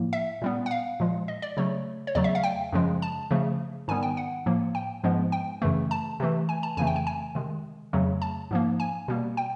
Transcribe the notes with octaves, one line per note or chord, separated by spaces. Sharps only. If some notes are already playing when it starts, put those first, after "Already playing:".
Already playing: A2 F3 A#3
E5
A#2 G3 B3
F#5
F5
A#2 F3 G#3
D#5
D5
C#3 F#3 A3 C#5
C#5
E2 C#3 F#3 A3 D5
E5
F5
G5
F#2 C#3 F3 G#3
A5
C#3 F3 A3
G#2 D#3 G3 B3 G#5
G5
F#5
A2 F3 A#3
G5
G#2 F3 G#3 B3
G5
F#2 C#3 E3 A3
A5
C3 E3 A3
G#5
A5
F2 C#3 E3 A3 G#5
G5
G#5
G#5
C3 D#3 G#3
F2 C#3 F#3 A3
A5
G#2 F3 A#3
G#5
B2 G3 A#3
G5